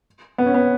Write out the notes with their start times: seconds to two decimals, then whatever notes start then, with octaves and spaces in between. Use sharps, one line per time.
0.38 B3
0.46 C#4
0.54 B3